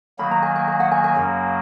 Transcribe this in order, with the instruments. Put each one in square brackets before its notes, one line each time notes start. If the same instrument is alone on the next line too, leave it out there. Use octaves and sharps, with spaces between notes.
[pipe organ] D#3 F#3 A#3 [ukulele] B5
[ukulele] A#5
G#5
G#5
G#5
F#5
G#5
G#5
[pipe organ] F#2 C#3 F#3 A#3